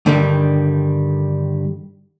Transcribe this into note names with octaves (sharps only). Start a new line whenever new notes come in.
G2 D3 D#3 G3